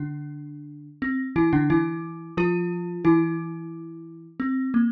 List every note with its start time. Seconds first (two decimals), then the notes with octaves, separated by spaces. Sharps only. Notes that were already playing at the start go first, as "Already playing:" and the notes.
Already playing: D3 D4
1.02 C4
1.36 E3 E4
1.53 D3 D4
1.70 E3 E4
2.37 F3 F4
3.05 E3 E4
4.40 C4
4.74 A#3